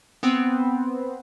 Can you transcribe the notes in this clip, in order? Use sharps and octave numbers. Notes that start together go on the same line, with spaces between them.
B3 C4